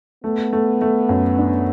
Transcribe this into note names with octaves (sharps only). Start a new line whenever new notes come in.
A3 B3
A3
A3
F#2
D4